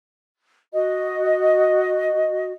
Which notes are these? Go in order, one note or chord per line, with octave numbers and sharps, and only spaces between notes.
F#4 D#5